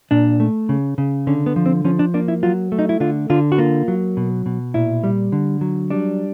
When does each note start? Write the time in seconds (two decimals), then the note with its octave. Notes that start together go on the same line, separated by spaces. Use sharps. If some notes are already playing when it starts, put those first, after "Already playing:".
0.11 A#2 D4
0.40 A3
0.69 C#3
0.98 C#3
1.27 D3 C#4
1.46 B3
1.56 F3
1.66 C4
1.85 F3 C#4
1.99 D4
2.14 A#3 D4
2.28 E4
2.43 F#3 F4
2.72 A3
2.79 D#4
2.89 E4
3.00 D3 F4
3.30 D3 F4
3.52 F#4
3.58 A#3 F4
3.88 F#3
4.17 B2
4.46 B2
4.74 A#2 E4
5.04 G3
5.32 D3
5.61 F#3
5.90 G3 D4